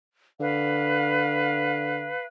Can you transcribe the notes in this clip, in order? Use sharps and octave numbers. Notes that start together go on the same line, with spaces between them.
D3 B4 F5